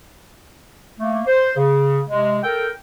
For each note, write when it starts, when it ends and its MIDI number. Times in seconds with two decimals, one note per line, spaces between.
1.00 1.21 57
1.00 1.21 58
1.27 1.54 72
1.57 2.01 49
2.10 2.39 48
2.10 2.39 56
2.43 2.68 69
2.43 2.68 70
2.43 2.68 79